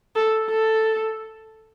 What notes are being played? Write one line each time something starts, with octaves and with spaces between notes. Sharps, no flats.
A4
A4